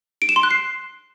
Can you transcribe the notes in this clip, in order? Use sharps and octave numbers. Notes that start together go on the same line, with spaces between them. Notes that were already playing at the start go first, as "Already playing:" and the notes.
D7
E7
C6
F#6
C7